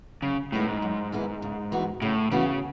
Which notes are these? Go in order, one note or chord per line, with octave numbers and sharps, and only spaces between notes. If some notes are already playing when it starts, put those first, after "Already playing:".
F#2 C#3
A2 D#3 G#3 B3 E4
G#2
F#2
D#3 G#3 B3 E4
C#3
E3 B3 F#4
A2 C#3
C#3 E3 B3 F#4